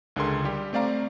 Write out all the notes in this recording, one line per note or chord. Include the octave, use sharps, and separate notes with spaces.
C#2 D3 D4 G#4 A#4 C6
G3 G4
A3 C4 D5 F5 A#5